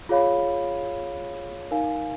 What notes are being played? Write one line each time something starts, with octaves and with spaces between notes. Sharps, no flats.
F4 G#4 C#5 F5 B5
D#4 A#4 F5 G#5